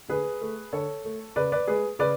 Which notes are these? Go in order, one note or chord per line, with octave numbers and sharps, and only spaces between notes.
D3 G#4 B4
A3
D3 A4 C#5
A3
C#3 B4 D5
B4 D5
G#3 G#4 B4
C#3 B4 D5